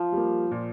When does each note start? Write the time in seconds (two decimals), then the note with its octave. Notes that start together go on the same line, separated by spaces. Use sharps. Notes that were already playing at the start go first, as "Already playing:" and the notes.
Already playing: F3
0.12 G3 A#3
0.51 A#2